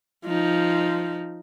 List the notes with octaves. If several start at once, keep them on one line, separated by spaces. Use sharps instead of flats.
F3 D#4